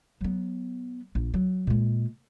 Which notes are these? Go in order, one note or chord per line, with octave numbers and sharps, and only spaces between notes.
F#3 B3
A#1
F#3
A#2 G#3